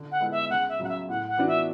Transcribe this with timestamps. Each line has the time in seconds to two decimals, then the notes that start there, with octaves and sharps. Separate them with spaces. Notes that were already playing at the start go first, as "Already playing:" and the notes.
Already playing: D3
0.11 F#5
0.20 G#3 B3 E4 A4
0.31 E5
0.50 C#2 F#5
0.69 E5
0.79 C#3 F#3 F#5
0.89 E5
1.09 A2 F#5
1.28 F#5
1.37 E3 B3 D4 F#4
1.47 E5